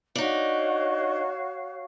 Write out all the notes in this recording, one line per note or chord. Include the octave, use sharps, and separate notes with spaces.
D4 D#4 F#4 C#5 F5